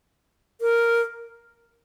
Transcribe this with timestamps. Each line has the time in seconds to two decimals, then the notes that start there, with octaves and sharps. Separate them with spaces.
0.61 A#4